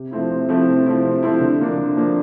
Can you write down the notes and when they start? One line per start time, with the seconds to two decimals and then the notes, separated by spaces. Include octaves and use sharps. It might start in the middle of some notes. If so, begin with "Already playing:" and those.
Already playing: C3
0.11 F3 A3 C4 E4
0.31 C3
0.49 F3 A3 C4 E4
0.67 C3
0.86 F3 A3 C4 E4
1.04 C3
1.23 F3 A3 C4 E4
1.41 D3
1.59 F3 A#3 D4
1.78 D3
1.97 F3 A#3 D4